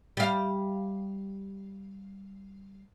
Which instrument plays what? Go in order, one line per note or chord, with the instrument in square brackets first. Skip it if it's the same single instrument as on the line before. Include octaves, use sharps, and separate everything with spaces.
[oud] G3 F5